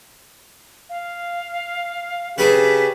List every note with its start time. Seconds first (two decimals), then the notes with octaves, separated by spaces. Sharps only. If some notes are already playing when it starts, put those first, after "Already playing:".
0.90 F5
2.38 C#3 D4 G4 G#4 B4 B6